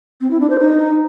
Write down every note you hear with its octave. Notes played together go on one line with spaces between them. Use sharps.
C4
E4
D4
C5
D#4